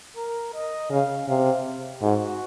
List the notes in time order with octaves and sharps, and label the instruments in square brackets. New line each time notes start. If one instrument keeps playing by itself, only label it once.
[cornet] A#4
D#5
[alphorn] C#3 [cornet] F5
[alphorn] C3 [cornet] F5
[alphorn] G#2 [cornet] F#4